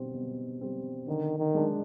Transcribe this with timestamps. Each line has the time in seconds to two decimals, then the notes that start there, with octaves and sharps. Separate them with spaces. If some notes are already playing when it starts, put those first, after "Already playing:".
Already playing: B2 G3 C4
0.14 B2
0.61 G3 C4
1.08 D3 D#3
1.39 D#3
1.55 G#3 D4